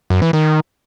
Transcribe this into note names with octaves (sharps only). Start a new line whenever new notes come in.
F#2
E3
D#3